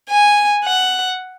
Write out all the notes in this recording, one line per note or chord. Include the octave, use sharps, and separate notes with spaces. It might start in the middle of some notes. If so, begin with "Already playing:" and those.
G#5
F#5